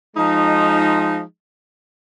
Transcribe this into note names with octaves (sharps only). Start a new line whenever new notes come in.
F3 G#3 D#4